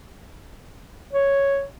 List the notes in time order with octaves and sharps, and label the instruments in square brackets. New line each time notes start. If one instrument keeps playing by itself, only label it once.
[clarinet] C#5